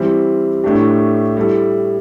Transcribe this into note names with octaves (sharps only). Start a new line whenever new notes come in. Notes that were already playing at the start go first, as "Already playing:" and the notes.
Already playing: E3 G3 C4
A2 A3 D4 G4
G3 E4 A4